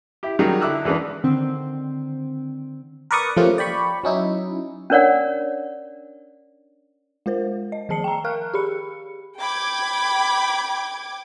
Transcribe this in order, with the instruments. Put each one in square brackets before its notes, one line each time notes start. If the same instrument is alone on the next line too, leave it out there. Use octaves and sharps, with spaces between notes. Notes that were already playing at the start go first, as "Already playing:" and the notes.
[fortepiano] E4 G4
D#3 F#3 G3 D#4 G#4
D3 E4 D6 E6 F#6
E2 E3 G#3 B3 D4
[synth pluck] D3 D#3 C4
[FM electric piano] A#4 B4 D5 C#6 D#6
F3 A3 A#3 C#4 F4 G4
D5 G5 B5 C#6
F#3 C#4 D#4 E4
[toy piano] C#4 D4 A#4 C#5 D5 F#5
[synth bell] G#3 F4 A#4 C5
D#5
D#3 F3 G#4 A5 C7 C#7
G5 A#5
A#4 F5 C#6 F6 F#6
G4 G#4 B5 C#7
[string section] G5 D6 G#6 [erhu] B5